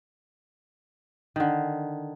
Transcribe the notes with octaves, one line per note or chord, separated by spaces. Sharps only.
D3 D#3